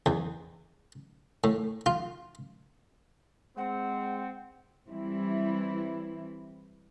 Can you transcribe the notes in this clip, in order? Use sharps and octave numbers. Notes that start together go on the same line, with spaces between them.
E2
A2
F4
G#3 C4 F#5
E3 G3 C4 E4